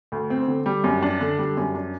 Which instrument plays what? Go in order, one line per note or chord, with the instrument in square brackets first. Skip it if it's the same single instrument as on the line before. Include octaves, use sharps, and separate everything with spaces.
[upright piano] D2
C4
D3
G3
F#2
D4
D3
G3
F#2
D4